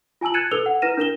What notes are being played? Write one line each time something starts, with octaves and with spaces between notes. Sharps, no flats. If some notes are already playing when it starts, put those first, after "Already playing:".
F4 G#5 A5 E6 F#7
F#6 G#6 A6 C#7 D#7 E7
A4 B4 E6 F7 G7
F#5
E4 B4 F6 A#6 D#7 E7
D4 A#4 E7 G7